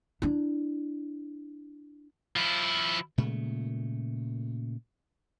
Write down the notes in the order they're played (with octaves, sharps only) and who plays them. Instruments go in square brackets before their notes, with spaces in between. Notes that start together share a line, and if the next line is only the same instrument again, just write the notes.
[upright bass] D4 E4
[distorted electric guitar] F3 E4
[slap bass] A#2 C#3 G#3 A3